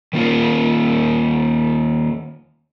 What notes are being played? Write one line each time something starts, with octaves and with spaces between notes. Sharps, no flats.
D#3 A#3 F4 A#4